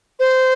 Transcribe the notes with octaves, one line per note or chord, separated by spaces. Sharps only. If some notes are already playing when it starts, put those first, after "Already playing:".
C5